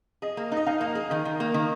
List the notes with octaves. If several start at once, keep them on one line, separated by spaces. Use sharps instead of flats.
G#4 D#5
A#3
D#4
D#5
D#4 F5
A#3
G#4
D#3 D#5
D#3
A#3
D#3